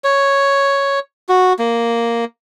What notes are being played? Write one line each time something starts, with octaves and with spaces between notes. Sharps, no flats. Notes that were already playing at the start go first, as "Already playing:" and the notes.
C#5
F#4
A#3